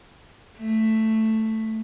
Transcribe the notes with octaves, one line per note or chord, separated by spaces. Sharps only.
A3